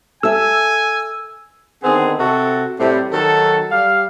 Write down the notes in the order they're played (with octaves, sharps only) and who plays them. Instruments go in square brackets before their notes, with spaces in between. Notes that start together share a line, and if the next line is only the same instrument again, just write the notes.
[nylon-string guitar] A4 E5 [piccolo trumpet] G#5 [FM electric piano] E6
[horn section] D3 D#3 B3 C4 G#4
C3 F#4 A4
A2 C3 G3
D#3 F#3 A4
G3 F5